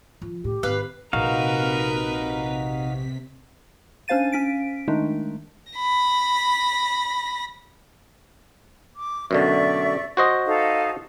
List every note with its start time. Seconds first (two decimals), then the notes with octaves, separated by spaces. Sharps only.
0.22 F3
0.44 A2 G4
0.63 G#1 B4 F5
1.13 A#1 C3 D#4 F#4 A#4 B4 F5 B6
4.08 C#4 D4 C5 F5 A6 D#7
4.32 C#4 B6 D7
4.88 D#3 G#3 A3 D4 D#4
5.73 B5 A#6
8.96 D6
9.31 F#2 B2 D3 D5 E5 C#6
10.17 F#4 C5 D#5
10.46 D#4 A4 F5